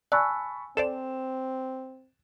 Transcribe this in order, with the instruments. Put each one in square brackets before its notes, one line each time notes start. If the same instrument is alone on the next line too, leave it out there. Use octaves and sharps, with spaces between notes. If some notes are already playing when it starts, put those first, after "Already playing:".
[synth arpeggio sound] D5 [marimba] G#5 E6 F#6 [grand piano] A5 B5 C#6
[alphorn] C4 [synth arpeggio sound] A4 C5 D5 [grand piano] E7